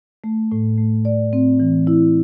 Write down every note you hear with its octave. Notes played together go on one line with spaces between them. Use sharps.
A3
A2
A3
D5
C4
E3
E4